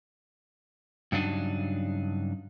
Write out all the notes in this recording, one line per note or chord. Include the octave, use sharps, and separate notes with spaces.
G2 C#3 F#3 D4 D#4